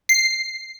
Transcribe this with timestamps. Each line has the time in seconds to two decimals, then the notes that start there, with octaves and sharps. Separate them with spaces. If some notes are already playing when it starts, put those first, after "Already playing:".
0.09 C7